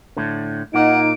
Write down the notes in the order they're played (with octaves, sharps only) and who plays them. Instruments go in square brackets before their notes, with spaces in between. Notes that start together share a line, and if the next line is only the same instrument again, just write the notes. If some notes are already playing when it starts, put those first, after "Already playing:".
[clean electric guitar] A2 D3
[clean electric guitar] A#2 A#3 [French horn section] D#4 [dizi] F#5 [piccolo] D7